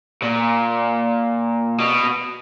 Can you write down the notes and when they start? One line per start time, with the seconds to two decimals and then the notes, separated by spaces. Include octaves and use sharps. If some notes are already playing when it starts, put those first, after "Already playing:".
0.22 A#2
1.78 B2